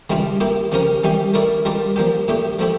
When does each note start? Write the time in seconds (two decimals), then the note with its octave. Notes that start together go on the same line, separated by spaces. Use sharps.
0.10 C#3 E3 G3 D4 F4
0.40 A#3 E4 G4
0.72 C#3 F3 C#4 G4 A#4
1.04 E3 G3 C#4 G4
1.34 A3 E4 A#4 D5
1.65 G3 D4 F4 A#4 D5
1.96 F3 A#3 D4 G4
2.28 A#2 A3 D4 G4
2.59 F3 A3 E4 G4